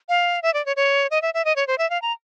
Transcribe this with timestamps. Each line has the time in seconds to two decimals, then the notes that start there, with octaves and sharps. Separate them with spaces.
0.09 F5
0.43 E5
0.54 D5
0.66 C#5
0.76 C#5
1.11 D#5
1.22 E5
1.34 E5
1.45 D#5
1.56 C#5
1.67 C5
1.78 E5
1.90 F5
2.02 A#5